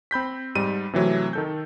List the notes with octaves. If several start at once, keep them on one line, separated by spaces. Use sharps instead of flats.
C4 B5 G6 B6
G#2 G3 D#7
C3 E3 F#3 A3
D#3 A4 G6